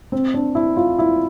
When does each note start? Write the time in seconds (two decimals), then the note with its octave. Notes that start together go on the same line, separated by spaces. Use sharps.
0.12 C4
0.34 D4
0.55 E4
0.77 F4
0.99 E4